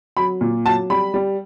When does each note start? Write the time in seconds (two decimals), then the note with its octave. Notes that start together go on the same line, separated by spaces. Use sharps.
0.17 F#3 B5
0.41 A#2
0.65 F#3 A5
0.90 G3 B5
1.14 G3